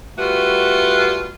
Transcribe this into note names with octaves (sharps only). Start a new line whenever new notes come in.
G3 A3 F4 F#4 B4